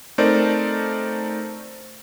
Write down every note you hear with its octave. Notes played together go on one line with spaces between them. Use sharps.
A3 C4 D#4 A#4 C5 D5